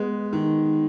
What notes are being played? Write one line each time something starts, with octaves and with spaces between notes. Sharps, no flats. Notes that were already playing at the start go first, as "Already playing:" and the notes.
Already playing: G#3 B3
D#3